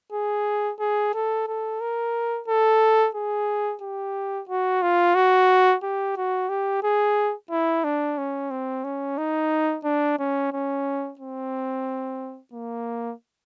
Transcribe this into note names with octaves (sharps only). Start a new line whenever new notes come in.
G#4
G#4
A4
A4
A#4
A4
G#4
G4
F#4
F4
F#4
G4
F#4
G4
G#4
E4
D4
C#4
C4
C#4
D#4
D4
C#4
C#4
C4
A#3